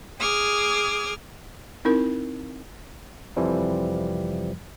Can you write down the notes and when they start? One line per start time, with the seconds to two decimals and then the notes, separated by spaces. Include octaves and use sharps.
0.20 G#4 D6 D#6 F6 G#6
1.85 C4 D#4 E4 A#4
3.36 F2 C3 E3 F3 G3